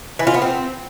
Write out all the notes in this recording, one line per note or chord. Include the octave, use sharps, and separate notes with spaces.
E3
F4
B3
C4